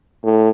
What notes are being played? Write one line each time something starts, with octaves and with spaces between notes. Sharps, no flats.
A2